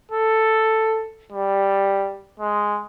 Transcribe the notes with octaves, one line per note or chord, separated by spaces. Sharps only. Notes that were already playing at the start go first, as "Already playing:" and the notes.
A4
G3
G#3